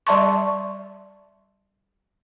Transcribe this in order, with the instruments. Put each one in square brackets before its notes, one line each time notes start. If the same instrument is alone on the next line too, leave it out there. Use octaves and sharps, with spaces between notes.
[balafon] G3 D5 E5 A5 C6 C#6